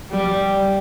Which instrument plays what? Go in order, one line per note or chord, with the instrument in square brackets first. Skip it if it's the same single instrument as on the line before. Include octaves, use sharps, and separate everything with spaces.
[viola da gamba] G3